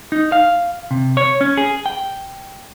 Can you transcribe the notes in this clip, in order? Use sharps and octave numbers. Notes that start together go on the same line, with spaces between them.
D#4
F5
C3
C#5
C#4
G#4
G5